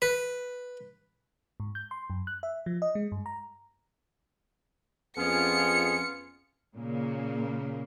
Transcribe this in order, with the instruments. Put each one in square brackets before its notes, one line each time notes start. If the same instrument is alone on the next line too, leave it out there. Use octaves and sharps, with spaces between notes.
[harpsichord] B4
[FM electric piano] G#2
G6
C6
F#2
F#6
E5
F3
D#5
G#3
G2
A#5
[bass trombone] F2 [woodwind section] B3 C#4 F4 [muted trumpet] G#4 [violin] C#7
[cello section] A#2 C#3 A#3